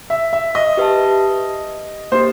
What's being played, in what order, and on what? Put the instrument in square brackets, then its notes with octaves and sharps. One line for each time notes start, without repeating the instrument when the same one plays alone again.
[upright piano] E5
E5
D#5
[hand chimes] G4 B4 E5 A5
[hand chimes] A#3 D#4 G4 [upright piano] C5